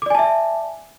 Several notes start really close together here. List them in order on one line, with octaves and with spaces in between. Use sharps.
D6 D5 G#5 A5 E5